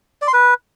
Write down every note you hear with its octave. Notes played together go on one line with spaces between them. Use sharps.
D5
C6
B4